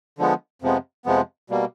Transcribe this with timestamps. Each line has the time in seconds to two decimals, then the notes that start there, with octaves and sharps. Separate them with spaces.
0.18 D3 F3 G#3 B3
0.62 F2 C3 F3 G#3 B3
1.05 F2 C3 F3 G#3 B3
1.50 B2 G3 A#3